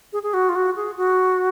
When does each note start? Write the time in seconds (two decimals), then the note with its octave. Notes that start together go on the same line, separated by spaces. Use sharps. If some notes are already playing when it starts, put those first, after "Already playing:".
0.13 G#4
0.23 G#4
0.34 F#4
0.49 F4
0.55 F#4
0.76 G#4
0.97 F#4